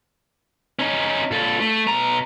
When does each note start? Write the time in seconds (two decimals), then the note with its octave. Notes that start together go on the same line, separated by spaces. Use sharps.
0.79 C#4 D#4
1.31 A#2 A4
1.60 A3
1.87 B2 A#5